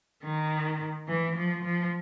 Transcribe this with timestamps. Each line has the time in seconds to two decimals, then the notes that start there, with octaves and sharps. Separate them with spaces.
0.24 D#3
1.08 E3
1.36 F3
1.64 F3